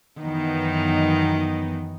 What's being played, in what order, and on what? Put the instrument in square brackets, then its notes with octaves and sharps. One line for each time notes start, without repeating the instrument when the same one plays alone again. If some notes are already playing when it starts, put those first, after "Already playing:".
[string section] F#2 E3 B3 D#4 [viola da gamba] D#3